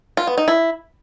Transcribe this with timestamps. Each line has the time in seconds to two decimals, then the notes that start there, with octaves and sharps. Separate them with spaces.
0.17 F4
0.27 B3
0.38 D#4
0.48 E4